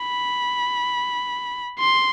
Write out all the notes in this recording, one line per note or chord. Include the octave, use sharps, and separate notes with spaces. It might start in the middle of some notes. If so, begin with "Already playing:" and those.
Already playing: B5
C6